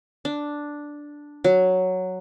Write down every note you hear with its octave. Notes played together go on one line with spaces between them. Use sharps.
D4
F#3